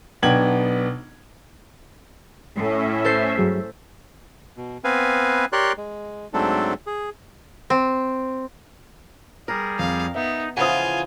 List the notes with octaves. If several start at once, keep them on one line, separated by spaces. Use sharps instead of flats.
B1 B3 D4 G5 G#6 F#7
A2 C#4 E5
A4 C5 C7
G2 F#3 G#4
B2
B3 C4 B4 F5 G#5
G4 A#4 C#5 D5 C6 F#6
G#3
G#2 F#3 A3 C4 D4 A4
G#4
C4
G3 G#4 A#4
F2 F5
B3 D#4 E5
C#3 E3 F3 F4 F#5 G#5 D#6